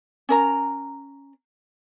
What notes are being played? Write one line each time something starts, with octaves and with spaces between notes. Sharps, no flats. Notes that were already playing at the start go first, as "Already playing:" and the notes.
C#4 A#4 A#5